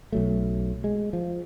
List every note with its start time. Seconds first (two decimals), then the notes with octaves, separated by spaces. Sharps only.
0.12 B1 F#3 A3
0.84 G#3
1.13 F3